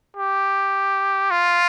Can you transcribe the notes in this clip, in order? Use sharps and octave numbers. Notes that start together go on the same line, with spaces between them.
G4
F4